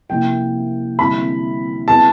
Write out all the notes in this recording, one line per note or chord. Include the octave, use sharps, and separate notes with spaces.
C3 F3 A#3 C#4 E4 G5
D3 G3 C4 E4 B5
B3 E4 G#4 B4 A5